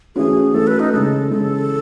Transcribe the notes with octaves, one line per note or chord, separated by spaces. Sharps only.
E3 A3 C#4 F#4 G#4
E3 A3 C#4 F#4 A4
B4
D#4
C#3 E3 G#3 A4
C#3 E3 G#3 A4